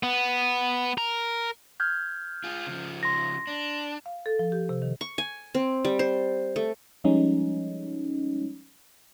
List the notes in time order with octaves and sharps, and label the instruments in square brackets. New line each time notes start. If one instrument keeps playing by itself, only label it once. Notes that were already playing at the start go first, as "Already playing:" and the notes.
[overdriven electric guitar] B3
A#4
[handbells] F6 G6 G#6
[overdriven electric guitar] F4 G#4
C#3 F3
[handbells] C6 A#6
[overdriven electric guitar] D4
[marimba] F5
A4
F3
G4
C3
D#3
[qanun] C#6
G#5
C4
G3
C5
A3
[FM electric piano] F3 G3 G#3 C#4 D#4